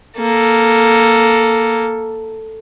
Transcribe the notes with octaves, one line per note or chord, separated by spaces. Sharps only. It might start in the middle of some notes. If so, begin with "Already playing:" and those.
A#3 A4